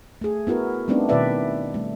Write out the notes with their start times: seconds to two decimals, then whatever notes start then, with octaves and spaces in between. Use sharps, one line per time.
0.21 A3 G#4
0.47 B3 E4 F#4 A#4
0.88 G3 A3 B3 C4 D4 D#4
1.09 B2 D#3 E4 B4 D5 E5
1.74 G3 A3